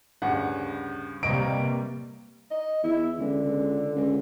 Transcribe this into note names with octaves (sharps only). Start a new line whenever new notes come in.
D2 G2 C#3 F#5
C3 G3 A#3 B4 D#5 C#6 D7
D#5
E2 E4
C#2 D3
C#2
C#2